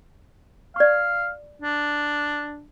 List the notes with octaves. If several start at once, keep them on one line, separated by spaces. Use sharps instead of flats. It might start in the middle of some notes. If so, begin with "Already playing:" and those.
D5 F5 C#6
D4